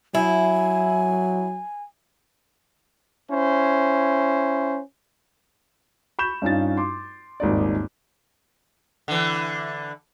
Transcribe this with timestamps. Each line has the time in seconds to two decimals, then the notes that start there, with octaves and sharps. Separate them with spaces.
0.15 F#3 E4 G#5
3.31 C#4 E4 C5
6.19 B5 C#6 G6 E7
6.42 G2 C#4 D#4 F4 A6
6.77 C6 D6
7.40 D#1 G#1 D#4 D5
9.08 D3 E3